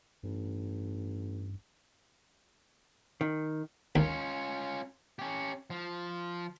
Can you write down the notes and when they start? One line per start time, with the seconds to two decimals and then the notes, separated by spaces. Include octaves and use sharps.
0.23 A1 G2
3.21 D#3
3.96 D#2 C#4 F4
5.19 C#4 G4
5.70 F3